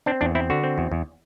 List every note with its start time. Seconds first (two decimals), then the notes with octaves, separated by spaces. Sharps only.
0.06 C4 D4
0.21 E2 D4
0.35 C4 E4
0.50 D3 F#4
0.63 C4
0.78 E2
0.92 E2